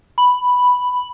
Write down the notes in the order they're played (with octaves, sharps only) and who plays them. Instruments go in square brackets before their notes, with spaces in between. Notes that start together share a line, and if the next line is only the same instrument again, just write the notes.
[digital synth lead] B5